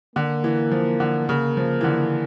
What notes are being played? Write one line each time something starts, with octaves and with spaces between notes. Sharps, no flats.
D3 A#3
E3
F3
D3
C#3 A#3
F3
E3
D3